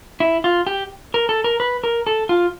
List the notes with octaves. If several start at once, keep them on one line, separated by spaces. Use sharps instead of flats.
E4
F4
G4
A#4
A4
A#4
B4
A#4
A4
F4